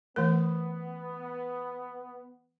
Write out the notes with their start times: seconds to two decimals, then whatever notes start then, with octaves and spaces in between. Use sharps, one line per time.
0.16 E3 A3 B3 A#4